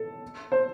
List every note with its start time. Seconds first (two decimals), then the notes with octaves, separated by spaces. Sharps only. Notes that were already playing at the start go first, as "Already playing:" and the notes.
Already playing: A4
0.52 C5